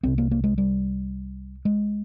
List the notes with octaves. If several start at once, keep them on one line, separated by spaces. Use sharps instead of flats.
C2 C3 C4
A#3
A#3
G#3
G3
G#3